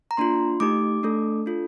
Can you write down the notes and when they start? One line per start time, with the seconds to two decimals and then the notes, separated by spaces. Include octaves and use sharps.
0.11 A#5
0.17 A#3 D4 F4 C6
0.60 A3 D#4 G4 D6
1.03 A3 D4 A4
1.46 D4 F4 A4